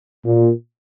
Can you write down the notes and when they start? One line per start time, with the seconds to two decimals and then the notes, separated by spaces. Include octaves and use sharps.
0.25 A#2